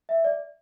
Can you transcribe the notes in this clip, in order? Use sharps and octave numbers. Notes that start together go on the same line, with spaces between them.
E5
D5